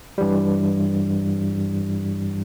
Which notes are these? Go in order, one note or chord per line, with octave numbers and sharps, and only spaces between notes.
G2 E3 G3